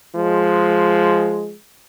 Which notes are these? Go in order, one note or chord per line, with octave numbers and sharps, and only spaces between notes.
F3 G#3